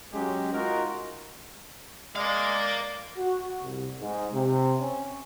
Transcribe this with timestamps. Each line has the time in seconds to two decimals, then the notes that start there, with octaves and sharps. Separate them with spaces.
0.13 F#3 G#3 C#4 G4
0.53 G#3 D#4 F4 F#4 A#4
2.16 G#3 A#4 D5 F5
3.18 F#4
3.64 C2
4.01 G#2
4.34 C3
4.81 C#4